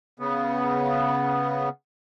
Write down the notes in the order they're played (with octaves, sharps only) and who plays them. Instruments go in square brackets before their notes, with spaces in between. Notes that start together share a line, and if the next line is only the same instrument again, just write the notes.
[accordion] C#3 B3